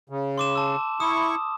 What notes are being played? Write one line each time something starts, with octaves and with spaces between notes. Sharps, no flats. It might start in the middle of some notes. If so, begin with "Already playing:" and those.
C#3
C6 D6 E7
A5 E6
E4 C#6 D#6